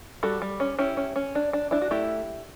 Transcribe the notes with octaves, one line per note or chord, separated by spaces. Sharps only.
G3 F#4 A4
G3
C#4
C#4 E4 G4
C#4
C#4
D4
D4
D4 E4
F#4
A3 E4 G4